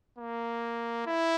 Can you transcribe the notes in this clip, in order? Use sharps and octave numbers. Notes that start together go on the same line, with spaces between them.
A#3
E4